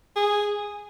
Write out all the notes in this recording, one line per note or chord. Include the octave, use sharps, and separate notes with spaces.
G#4